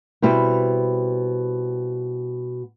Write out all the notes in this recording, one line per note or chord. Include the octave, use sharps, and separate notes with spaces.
B2 G3 C4 E4